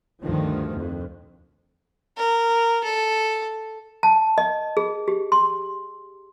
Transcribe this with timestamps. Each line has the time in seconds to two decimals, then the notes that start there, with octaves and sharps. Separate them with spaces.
0.23 D2 G2 D#3 F3
0.76 F2
2.17 A#4
2.84 A4
4.03 A5
4.38 D#5
4.77 G#4
5.08 G4
5.32 C6